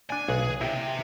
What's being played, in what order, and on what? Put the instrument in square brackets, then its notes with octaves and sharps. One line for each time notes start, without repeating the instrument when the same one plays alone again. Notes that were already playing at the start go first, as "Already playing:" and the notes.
[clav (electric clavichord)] D4 D5 [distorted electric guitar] G#5
[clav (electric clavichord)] B1 F#4 B4 [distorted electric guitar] G#4
[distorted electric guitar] C3 [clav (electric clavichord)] E4 G4 G5